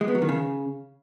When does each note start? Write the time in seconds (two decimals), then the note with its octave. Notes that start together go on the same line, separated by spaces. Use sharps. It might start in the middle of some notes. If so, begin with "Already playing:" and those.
0.01 G#3
0.08 B3
0.15 F#3
0.22 D#3
0.29 C#3